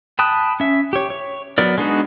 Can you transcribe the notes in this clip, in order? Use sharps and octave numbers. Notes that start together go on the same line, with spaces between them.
G5 A5 B5 D#6 F#6
C#4 E5
G4 C#5
C#5
F#3 B3 A#4 D5
G#3 B3 D4 D#4 F#4